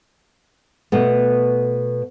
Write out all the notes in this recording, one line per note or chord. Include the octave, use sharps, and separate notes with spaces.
B2 A3 B3